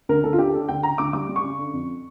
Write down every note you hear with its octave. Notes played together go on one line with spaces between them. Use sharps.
D2 A#4
D2 A4
F4
D3 G4
D3 A4
D2 G5
C#3 A#5
D2 D6
G3 D6
G3
C#6
C#3
D3
F2